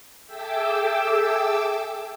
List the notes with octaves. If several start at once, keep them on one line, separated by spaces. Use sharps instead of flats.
G#4 A4 E5 G5 D6 E6